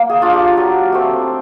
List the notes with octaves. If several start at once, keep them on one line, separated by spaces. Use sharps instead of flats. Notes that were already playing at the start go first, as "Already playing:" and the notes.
Already playing: A#3
G#4
D4 F4
G4
F#3
A3 C4